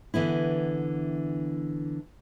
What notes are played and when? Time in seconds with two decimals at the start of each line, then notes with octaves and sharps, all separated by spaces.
0.14 D3 E3 B3 E4